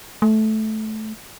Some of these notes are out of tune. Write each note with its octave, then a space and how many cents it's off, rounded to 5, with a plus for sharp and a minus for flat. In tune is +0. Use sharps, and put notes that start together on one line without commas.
A3 -15